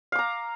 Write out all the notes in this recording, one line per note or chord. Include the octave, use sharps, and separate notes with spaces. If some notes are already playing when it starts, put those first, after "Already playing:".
F5 A#5 D6